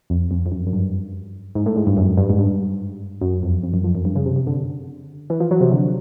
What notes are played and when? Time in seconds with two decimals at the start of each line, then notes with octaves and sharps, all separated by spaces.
0.10 F2
0.31 F2
0.46 F2
0.52 F#2
0.67 F#2
0.73 G2
1.55 G#2
1.66 A2
1.76 G#2
1.87 G2
1.97 F#2
2.17 G2
2.30 G#2
2.38 G2
3.21 F#2
3.43 F2
3.63 F2
3.74 F#2
3.84 F2
3.95 F#2
4.05 G2
4.15 C#3
4.26 C3
4.36 C3
4.47 D3
5.30 E3
5.40 F3
5.51 F#3
5.61 C3
5.71 D3